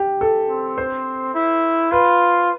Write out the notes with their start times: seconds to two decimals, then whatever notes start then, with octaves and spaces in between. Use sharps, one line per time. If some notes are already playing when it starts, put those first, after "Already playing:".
Already playing: G4
0.21 A4
0.49 C4
0.78 C5
1.35 E4
1.91 F4 B4